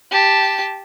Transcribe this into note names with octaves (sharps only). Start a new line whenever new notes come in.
G4 A5